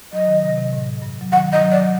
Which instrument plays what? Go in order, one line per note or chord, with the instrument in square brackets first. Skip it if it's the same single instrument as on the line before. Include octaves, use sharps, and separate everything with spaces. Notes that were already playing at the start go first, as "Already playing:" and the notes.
[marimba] F#3 [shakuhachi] D#5
[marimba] D#3
C3
C3
A2
G2
F#3
[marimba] D#3 [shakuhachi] F#5
[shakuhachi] D#5
[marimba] F#3
[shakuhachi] D5